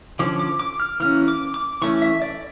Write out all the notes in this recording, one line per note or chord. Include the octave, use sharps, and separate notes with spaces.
D3 F3 C#4 D6
D6
D6
F6
E3 A#3 C#4 F6
D6
D6
E3 A3 C#4 C#6
E5
D5